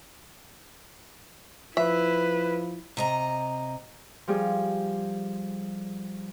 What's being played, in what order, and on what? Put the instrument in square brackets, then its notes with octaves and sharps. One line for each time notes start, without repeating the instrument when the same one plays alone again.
[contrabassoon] F3 [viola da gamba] E4 [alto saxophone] B4 [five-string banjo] E5
[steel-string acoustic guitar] C3 D#5 A#5
[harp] F3 G3 G#4